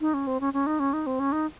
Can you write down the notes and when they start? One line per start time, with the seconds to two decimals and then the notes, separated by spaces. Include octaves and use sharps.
0.01 D#4
0.14 C#4
0.27 C4
0.41 C#4
0.54 C#4
0.67 D#4
0.80 C#4
0.93 D#4
1.07 C4
1.20 C#4
1.32 D#4